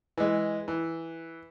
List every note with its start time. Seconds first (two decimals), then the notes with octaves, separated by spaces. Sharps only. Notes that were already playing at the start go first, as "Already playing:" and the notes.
0.17 E3 G#3
0.68 E3